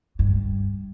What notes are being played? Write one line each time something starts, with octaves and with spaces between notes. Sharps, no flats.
G2